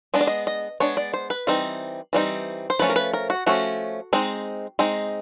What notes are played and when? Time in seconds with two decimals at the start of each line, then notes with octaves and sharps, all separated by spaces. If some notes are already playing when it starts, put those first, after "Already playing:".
0.14 G#3 B3 D4 D#5
0.21 D5
0.27 D#5
0.47 D#5
0.80 G#3 B3 D4 C#5
0.97 D5
1.14 C5
1.30 B4
1.47 E3 G3 C4 D#4
2.13 E3 G3 C4 D#4
2.70 C5
2.79 F3 A3 C#4 B4
2.90 A#4
2.96 B4
3.13 A#4
3.30 F#4
3.46 F3 A3 C#4 F#4
4.13 G#3 C4 D#4
4.79 G#3 C4 D#4